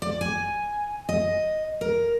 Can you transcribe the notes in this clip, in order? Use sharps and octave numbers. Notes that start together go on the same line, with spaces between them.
D5
G#5
D#5
A#4